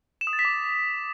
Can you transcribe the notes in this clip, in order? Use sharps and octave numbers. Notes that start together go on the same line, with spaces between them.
E7
D#6
A6
B6
D6